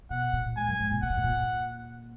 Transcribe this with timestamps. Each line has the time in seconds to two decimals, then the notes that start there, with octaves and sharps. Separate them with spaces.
0.10 B2 F#5
0.33 A#2
0.57 G#2 G#5
0.68 F#2
0.79 G#2
0.91 A#2
1.03 B2 F#5
1.10 A#2
1.17 G#2
1.24 A#2